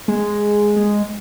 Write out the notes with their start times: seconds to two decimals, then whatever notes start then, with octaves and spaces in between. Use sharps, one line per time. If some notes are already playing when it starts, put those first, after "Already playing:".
0.08 G#3
0.76 G#3